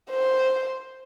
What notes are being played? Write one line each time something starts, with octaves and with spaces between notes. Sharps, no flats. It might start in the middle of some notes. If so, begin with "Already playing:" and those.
C5